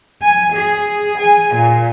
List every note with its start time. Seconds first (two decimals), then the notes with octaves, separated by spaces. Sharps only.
0.21 G#5
0.55 G#4
1.19 G#5
1.55 A#2